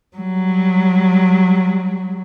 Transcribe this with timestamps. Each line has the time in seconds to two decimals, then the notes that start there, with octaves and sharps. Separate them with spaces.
0.17 F#3 G3